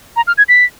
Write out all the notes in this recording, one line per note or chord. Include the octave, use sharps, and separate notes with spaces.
A#5
F6
G#6
B6